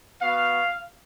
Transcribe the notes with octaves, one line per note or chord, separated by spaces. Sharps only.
B3 F#4 F5